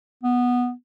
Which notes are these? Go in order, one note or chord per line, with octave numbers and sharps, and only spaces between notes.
B3